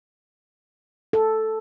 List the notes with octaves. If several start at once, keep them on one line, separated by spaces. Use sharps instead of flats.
A4